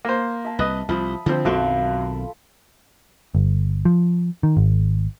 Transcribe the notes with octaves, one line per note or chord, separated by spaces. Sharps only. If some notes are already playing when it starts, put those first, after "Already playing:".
A#3 C5
E5 A5
C2 B4 D#5
C2 F3 E5 B5 D#6
D3 F3 C4
B1 F#2 D#3 F#3 C4 F4 A4 E5
G1
F3
D#3
G#1